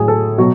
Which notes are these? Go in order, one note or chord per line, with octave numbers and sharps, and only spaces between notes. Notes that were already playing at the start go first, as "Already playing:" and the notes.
Already playing: A2 F#3 G#4
A4
B2 F#3 F#4